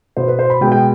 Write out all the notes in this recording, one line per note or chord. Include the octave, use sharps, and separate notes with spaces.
B2 B3 C5
B4
C5
B5
B2 G#3 B3 G5
G5